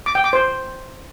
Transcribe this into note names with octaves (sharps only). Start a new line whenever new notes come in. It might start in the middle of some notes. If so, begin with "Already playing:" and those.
D6
G5
D6
C5